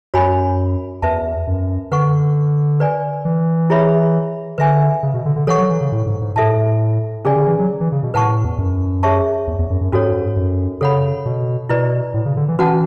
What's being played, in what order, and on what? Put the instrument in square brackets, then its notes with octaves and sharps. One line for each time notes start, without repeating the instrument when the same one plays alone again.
[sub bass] F#2 [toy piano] F#4 C#5 G#5 B5
[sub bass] E2 [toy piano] B4 E5 A5
[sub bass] F#2
[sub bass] D3 [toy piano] B4 F#5 C#6
[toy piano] B4 D5 G#5
[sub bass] E3
[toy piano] E4 G#4 C#5 E5 B5
[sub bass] D3 [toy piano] B4 E5 G#5
[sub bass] C#3
B2
D3
D3
[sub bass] E3 [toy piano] A4 C#5 F#5 C#6
[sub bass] F#3
E3
C#3
A2
G#2
G#2
[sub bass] A2 [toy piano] A4 E5 A5
[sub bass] C#3 [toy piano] C#4 G#4 D5 G#5
[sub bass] D3
E3
F#3
E3
C#3
B2
[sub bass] A2 [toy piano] B4 F#5 A5 C#6
[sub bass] E2
F#2
[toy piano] G#4 C#5 E5 A5 C#6
[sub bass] E2
E2
F#2
F#2
[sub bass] G#2 [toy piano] C#4 F#4 A4 C#5
[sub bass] F#2
[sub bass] C#3 [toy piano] A4 C#5 F#5 B5
[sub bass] B2
[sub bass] B2 [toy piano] E4 B4 D5
[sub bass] A2
C#3
D3
E3
[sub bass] E3 [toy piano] C#4 F#4 B4 F#5 A5